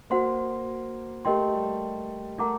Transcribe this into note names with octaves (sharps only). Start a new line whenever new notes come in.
A#3 F#4 C5 F#5 C6
A3 G4 A#4 D#5 G5 C6
G3
A3 A#4 F#5 A#5 D6